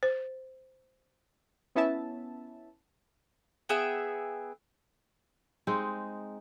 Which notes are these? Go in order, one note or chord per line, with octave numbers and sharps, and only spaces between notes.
C5
B3 C#4 E4 E5 A5
B3 G#4 E5 G5
G#3 C4 D#4